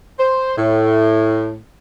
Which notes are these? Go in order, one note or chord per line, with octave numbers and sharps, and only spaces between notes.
C5
A2